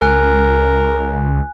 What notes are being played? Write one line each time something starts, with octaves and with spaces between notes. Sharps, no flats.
C#2 A#4 G#5 F#6